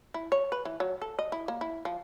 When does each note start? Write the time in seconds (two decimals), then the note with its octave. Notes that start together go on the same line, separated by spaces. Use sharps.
0.14 E4
0.32 C#5
0.52 B4
0.65 E3
0.80 F#3
1.02 A4
1.19 D#5
1.32 E4
1.48 A#3
1.61 E4
1.85 F3